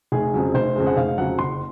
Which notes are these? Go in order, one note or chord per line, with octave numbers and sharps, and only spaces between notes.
F1 G#4
F2 C#3 F#3
F1 C5
F2 C#3 G#3
F#5
F1 F5
F2 C#3 F#3 F#5
F#1 C6